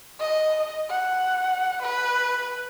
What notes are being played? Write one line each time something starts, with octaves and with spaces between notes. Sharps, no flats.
D#5
F#5
B4